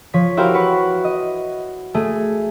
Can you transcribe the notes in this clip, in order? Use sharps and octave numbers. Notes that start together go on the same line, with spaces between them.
F3 C#5 B6
E4 F#4 G4 A#4 C5 F5
B4 F#5 C#6
D#5
A3 G#4